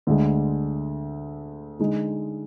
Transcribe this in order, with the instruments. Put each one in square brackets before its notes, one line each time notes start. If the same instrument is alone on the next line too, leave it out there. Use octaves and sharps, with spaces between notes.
[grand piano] D2 D3 G#3
D3 G#3 D#4